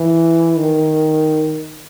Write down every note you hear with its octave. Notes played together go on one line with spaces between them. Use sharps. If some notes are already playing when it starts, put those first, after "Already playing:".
Already playing: E3
D#3